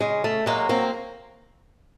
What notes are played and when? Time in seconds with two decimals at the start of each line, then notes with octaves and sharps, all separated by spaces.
0.01 C#3 G#3
0.24 A3
0.46 F#3 G#3 A#3
0.69 A#3 C4